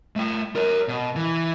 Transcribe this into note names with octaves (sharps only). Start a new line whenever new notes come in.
A3 G5
A#4 C#5
B2
E3